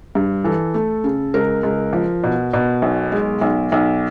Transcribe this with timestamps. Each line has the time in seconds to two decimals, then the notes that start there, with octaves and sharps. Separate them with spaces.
0.15 G2
0.45 E3 A4
0.74 A3
1.04 C#3
1.34 C#2 A#4
1.63 C#2
1.93 F3
2.24 B2
2.53 B2
2.82 B1
3.12 G#3
3.41 B1
3.72 B1